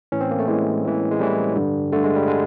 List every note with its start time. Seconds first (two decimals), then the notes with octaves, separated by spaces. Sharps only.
0.12 A2 E3 C#4
0.21 C4
0.31 A#3
0.39 A3
0.48 A2 E3 G#3
0.85 A2 E3
1.11 G#3
1.20 A2 E3 G3
1.56 G2 D3
1.92 G2 D3 A3
2.04 G#3
2.16 G3
2.28 D3 G#3